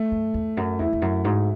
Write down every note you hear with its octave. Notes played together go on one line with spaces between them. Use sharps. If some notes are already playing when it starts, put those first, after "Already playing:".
Already playing: A3
F#2
E2
F#2
E2 E4
E2
F#2
G#2 F#4